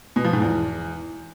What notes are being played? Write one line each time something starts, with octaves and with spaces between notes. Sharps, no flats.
B2
F3
G#2
E2